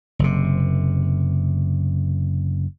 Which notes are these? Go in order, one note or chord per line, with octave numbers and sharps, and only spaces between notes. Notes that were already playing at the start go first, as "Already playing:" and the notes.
F#1 C3